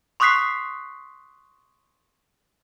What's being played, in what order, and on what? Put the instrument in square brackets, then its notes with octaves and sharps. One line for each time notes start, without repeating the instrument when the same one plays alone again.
[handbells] C6 C#6 D#6 F#6 B6 C7